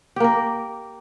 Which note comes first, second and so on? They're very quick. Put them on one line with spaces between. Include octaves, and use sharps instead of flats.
G4 A#3 A#4